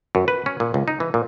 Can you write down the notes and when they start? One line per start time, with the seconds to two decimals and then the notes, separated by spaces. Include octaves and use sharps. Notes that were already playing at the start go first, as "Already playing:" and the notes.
0.15 F#2
0.28 B4
0.46 C#4
0.60 A#2
0.74 C#2
0.88 D#4
1.00 E3
1.14 A#2